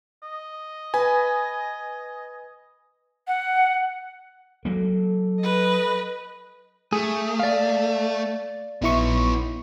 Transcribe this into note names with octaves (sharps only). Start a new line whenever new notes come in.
D#5
B4 G#5
F#5
F#3 A#3 A4
B4 D#5
A3 G#4
D5 F5
A#1 B3 D#4 E4 C#6